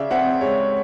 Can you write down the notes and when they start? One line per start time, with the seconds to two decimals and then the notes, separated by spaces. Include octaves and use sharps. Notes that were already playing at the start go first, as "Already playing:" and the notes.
Already playing: C#3 D5 E5
0.11 C4 E5 F#5
0.41 G#3 C#5